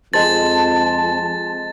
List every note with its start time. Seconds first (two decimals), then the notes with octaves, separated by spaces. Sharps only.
0.14 F2 G#3 C5 A5 A6